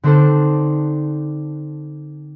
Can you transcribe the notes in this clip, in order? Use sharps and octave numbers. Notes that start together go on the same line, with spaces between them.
D3 C4 D4 D#4 A4 C5